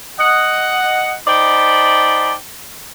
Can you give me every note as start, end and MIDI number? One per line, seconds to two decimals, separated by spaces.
0.19 1.14 75
0.19 1.14 78
1.27 2.33 63
1.27 2.33 72
1.27 2.33 74
1.27 2.33 79
1.27 2.33 81
1.27 2.33 83